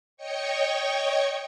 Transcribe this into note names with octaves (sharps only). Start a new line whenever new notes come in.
C#5 D#5 G5 C#6